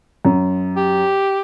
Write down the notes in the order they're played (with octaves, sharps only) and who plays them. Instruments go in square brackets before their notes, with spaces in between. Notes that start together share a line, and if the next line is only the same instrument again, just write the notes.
[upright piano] F#2
[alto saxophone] G4